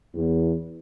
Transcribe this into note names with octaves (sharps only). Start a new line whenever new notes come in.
E2